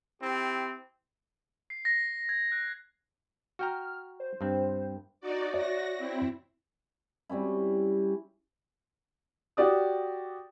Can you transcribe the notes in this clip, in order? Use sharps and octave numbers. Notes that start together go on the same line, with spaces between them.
C4 E4 G4
C7
A#6
G#6
F#6
F#4 G5 A#5 F6
C5
G2 C4
D#4 F#4 D5
F#4 C#5 D5 E5 A#6
C4 E4
G3 C4 C#4 E4
F#4 G4 D5 D#6